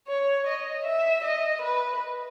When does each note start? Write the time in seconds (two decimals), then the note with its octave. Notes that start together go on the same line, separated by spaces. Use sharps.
0.08 C#5
0.47 D#5
0.84 E5
1.24 D#5
1.62 B4